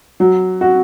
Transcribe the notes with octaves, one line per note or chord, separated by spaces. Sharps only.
F#3
F#4